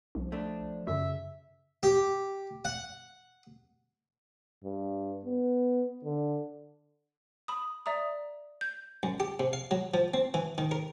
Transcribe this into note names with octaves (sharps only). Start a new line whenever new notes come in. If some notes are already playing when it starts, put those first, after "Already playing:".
C2 F3
A3 D4
F#2 C#3 E5
G4
F#5
G2
B3
D3
B5 D#6
D5 E5 A#5 D#6
G6
F#2
G4
C3
F5
F#3
F3
C4
E3
D#3
A#4